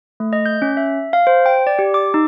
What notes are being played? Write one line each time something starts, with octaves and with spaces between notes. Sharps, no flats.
A3
D#5
G6
C#4
E5
F5
C5
G5
D5
G4
D6
D#4